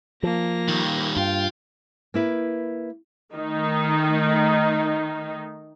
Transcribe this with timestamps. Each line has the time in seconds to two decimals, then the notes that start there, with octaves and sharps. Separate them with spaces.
0.23 F3 A#3 A#6
0.68 D#3 G3
1.16 G2 F4 G5
2.14 A#3 E4 B4
3.34 D#3 A3 D#4